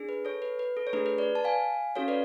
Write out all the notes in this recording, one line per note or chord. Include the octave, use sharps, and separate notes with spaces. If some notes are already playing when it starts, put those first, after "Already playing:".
Already playing: D4 G#4
B4
A4 C#5
B4
B4
A4
C#5
A3 D4 G#4 B4
B4
B4 D5
A5
F5 G#5
C#4 F#4 A4 C#5 F5
B4 D5